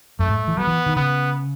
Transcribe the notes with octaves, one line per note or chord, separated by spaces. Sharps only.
F#2 A3
G#2
E3
F#3 B3
E3
D#3
C#3 B3